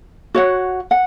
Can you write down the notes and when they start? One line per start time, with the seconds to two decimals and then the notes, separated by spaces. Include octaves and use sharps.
0.35 F#4 C#5 F#5
0.91 F#5